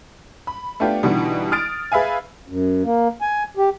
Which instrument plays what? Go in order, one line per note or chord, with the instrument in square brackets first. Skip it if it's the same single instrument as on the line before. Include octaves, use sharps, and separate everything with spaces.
[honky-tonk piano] B5
A3 B3 D4 F4 G4
B2 D3 E3 G3 D#4 F#4
D#6 F6 A6 D7
G#4 B4 E5 F5 G#5
[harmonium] F#2
A#3
G#5
G4